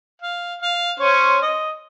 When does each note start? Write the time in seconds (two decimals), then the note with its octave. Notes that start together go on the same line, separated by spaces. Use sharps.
0.22 F5
0.62 F5
1.00 C#4 C5 C#5
1.42 D#5